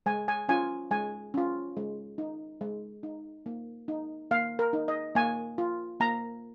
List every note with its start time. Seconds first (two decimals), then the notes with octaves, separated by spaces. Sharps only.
0.06 G#3 G#5
0.28 G#5
0.49 C#4 F4 G#5
0.91 G#3 G#5
1.34 C#4 F4
1.77 G#3
2.18 D#4
2.61 G#3
3.03 D#4
3.46 A#3
3.88 D#4
4.31 A#3 F5
4.59 A#4
4.73 D#4
4.88 D#5
5.15 A#3 G#5
5.58 F4
6.00 A#3 A#5